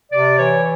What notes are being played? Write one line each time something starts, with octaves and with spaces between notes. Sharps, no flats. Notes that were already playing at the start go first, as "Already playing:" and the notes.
C3 D5
E3 C#5